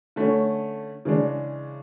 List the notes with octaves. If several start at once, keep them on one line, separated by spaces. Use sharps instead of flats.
D3 A3 C#4
C#3 E3 G#3 D4